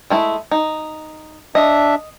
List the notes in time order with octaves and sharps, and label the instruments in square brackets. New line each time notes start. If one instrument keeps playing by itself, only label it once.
[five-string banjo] G#3 A3 E4
D#4
[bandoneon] D4 E5 [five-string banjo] D#5